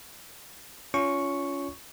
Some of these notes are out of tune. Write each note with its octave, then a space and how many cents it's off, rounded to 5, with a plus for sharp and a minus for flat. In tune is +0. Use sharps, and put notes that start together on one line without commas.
C#4 +25 F4 +0 C#6 +0